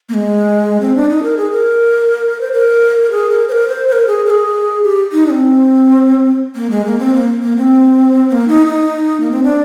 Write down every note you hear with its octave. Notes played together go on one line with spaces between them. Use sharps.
A#3
G#3
C4
D4
D#4
A#4
G#4
A#4
C5
A#4
G#4
A#4
C5
A#4
C5
C5
A#4
G#4
A#4
G#4
G4
D#4
D4
C4
A#3
G#3
A#3
C4
A#3
A#3
C4
C4
A#3
D#4
D#4
A#3
C4
D4